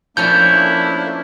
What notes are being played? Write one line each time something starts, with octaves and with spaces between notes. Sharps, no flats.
F3 A3 A#3 C#4 D4 E4 A4 G6